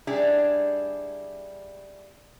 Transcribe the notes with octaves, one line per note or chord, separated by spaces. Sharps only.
G3 D4 E4 G#4